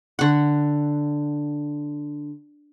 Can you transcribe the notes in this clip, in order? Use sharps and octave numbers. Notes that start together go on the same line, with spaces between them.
D3 F#5